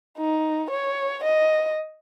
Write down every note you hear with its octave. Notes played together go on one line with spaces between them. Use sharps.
D#4
C#5
D#5